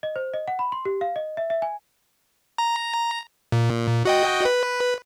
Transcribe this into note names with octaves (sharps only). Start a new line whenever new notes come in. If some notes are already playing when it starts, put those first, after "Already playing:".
D#5
C5
D#5
F#5
B5
C6
G4
F5
D#5
E5
E5
G#5
A#5
A#2
F#4 D#5 G5
B4